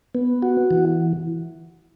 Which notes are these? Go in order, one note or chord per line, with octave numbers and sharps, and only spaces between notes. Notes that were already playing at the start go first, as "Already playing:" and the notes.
B3
F#4
E3